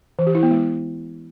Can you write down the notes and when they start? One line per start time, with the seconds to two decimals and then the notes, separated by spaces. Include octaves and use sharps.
0.19 E3
0.27 G4
0.35 E4
0.43 B3
0.51 G#3